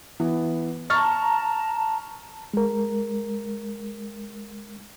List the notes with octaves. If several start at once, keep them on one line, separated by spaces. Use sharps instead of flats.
E3 B3
A5 A#5 C#6 F6 A6
G#3 A#4